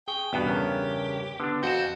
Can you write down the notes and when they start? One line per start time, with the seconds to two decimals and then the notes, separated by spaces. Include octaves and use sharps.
0.08 G#4 G5 C#6
0.33 E2 G2 B2 B3 G4
0.46 C#3 A#4 C#5
1.40 D3 B3 D4
1.63 F2 F#4 A5 G6